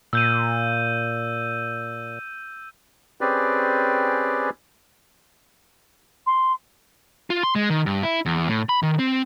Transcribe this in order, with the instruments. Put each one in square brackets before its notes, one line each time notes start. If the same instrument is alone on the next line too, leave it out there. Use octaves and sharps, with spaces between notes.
[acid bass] A#2 [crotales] E6 G6 D#7
[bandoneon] C4 C#4 G4 G#4 B4 D5
[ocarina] C6
[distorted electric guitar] F4
C6
G#3
D#3
G2
E4
E2
A2
B5
D#3
C4